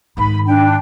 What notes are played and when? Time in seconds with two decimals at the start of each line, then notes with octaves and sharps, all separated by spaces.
0.17 G#2 D#3 B5
0.47 D4 G5